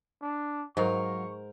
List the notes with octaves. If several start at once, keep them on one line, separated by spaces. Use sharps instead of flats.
D4
G#2 F#3 A#4 C5 F5 C#6